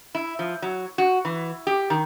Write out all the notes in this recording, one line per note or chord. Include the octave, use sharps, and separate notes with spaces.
E4
F3
F#3
F#4
E3
G4
D#3